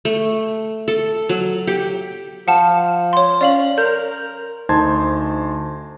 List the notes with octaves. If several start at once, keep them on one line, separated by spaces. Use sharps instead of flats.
A3
A4
F#3
G4
F3 F#5 A5 E7
C#5 C6
C#4 D5 F5 F#7
A#4 G6
D2 D#4 C5 A5 C6 G#6